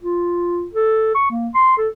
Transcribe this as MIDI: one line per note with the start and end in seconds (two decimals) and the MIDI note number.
0.03 0.66 65
0.74 1.13 69
1.15 1.29 85
1.31 1.49 58
1.54 1.77 84
1.78 1.88 69